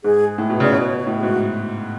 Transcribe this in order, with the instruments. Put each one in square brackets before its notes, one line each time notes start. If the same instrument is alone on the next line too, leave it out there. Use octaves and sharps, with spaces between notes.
[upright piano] G#2 [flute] G#4
[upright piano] A2
B2
[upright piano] C#3 [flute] D5
[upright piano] B2 [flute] C#5
[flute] B4
C#5
F#4
[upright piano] A2
[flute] G#4
[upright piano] G#2 [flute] F#4